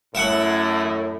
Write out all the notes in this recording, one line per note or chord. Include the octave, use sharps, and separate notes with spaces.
F#2 A2 E5 F#5